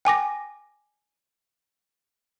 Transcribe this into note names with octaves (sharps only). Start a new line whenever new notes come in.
G5 G#5 D6 A#6